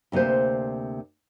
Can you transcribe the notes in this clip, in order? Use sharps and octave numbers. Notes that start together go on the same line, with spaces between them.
D2 C3 A#3 B4 C5